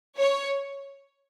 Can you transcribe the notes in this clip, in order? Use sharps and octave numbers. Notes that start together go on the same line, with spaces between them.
C#5